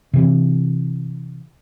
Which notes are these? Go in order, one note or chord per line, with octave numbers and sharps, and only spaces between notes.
C3 E3 C4